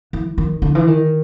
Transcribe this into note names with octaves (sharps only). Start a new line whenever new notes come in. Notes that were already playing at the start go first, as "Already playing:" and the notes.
E3
D#3
D3
E3
D#3